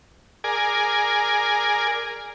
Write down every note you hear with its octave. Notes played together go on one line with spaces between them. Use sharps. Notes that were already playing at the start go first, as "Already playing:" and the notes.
G#4 A#4 D5 G#5